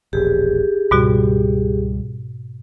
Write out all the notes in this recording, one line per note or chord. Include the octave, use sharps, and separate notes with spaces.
E1 A#1 G4 G#4
C#2 G#2 B2 G3 F#4